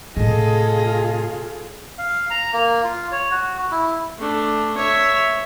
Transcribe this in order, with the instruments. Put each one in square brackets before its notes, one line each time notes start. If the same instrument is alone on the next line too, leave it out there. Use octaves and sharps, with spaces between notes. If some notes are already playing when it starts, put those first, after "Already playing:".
[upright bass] A2 C3 [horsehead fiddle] F4 G#4 [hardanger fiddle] A4 D#5
[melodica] F5
A#5
A#3
F4
C#5
F#4
E4
[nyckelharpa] A3 D4
C#5 E5